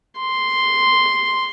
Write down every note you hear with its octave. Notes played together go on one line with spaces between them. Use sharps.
C6